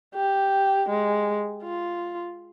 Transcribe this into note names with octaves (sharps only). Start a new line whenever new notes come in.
G4
G#3
F4